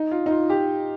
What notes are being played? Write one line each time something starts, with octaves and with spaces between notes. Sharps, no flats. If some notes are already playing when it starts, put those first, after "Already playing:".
Already playing: D#4
F4
D#4
F4
G4